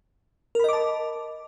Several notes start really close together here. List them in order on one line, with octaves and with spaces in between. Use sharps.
A#4 B5 D#5 D6 A5